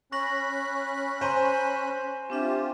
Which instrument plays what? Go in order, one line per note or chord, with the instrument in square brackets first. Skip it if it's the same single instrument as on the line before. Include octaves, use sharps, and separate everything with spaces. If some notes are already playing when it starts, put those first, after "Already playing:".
[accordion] C#4 B5 F#6 [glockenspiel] C#6 A#6 F#7
[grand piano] C5 A#5 C6 [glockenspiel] G#5 D#7
[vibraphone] C4 D4 E5 [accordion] F4 G4